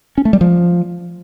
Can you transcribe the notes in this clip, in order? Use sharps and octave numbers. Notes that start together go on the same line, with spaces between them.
C#4
A3
G3
F3